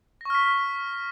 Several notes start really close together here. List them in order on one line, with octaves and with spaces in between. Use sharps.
A#6 C#6 F6 B6